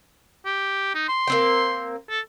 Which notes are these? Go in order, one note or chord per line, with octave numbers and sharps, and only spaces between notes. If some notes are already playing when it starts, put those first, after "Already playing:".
G4
D#4
C6
A#3 C4 G5
A4